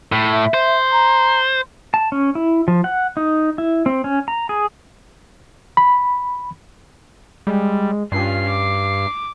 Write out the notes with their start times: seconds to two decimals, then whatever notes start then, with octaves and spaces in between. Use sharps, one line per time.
0.12 A2
0.30 E5
0.54 C5
0.92 A#5
1.94 A5
2.12 C#4
2.35 E4
2.68 F3
2.84 F#5
3.17 D#4
3.58 E4
3.86 C4
4.04 C#4
4.28 A#5
4.49 G#4
5.77 B5
7.47 G3 G#3
8.12 G2 C#4 F4 C7
8.49 D6